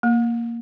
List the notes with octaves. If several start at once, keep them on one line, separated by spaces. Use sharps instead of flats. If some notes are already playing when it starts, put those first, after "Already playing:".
A#3